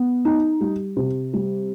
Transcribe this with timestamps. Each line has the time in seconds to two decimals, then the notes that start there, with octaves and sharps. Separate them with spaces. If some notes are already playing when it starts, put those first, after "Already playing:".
Already playing: B3
0.25 D#4
0.61 G3
0.96 C3
1.33 G3